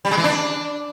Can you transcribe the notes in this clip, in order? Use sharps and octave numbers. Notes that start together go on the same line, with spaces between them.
G3
G#3
E3
D4